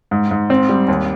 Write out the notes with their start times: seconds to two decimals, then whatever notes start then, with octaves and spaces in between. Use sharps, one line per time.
0.11 G#2
0.31 G#2
0.50 C4
0.69 G3
0.88 D#2